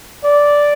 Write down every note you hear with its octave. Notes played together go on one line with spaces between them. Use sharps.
D5